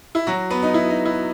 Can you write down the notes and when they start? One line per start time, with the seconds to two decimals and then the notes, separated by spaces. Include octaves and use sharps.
0.15 E4
0.27 F#3 F#4
0.51 B3 B4
0.63 D#4
0.74 E4
0.89 D#4
1.05 E4